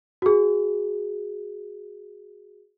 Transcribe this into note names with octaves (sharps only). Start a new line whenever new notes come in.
F#4 G#4